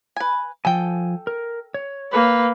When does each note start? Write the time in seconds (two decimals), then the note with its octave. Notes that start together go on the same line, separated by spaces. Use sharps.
0.16 B4 G#5
0.65 F3 A4 G5 G#5
1.27 A#4
1.74 C#5
2.12 A#3 B4